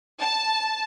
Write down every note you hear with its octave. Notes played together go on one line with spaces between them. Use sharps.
A5